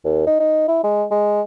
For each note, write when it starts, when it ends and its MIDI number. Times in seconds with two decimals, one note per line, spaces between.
0.04 0.23 39
0.27 0.36 63
0.40 0.66 63
0.68 0.80 64
0.84 1.05 56
1.11 1.42 56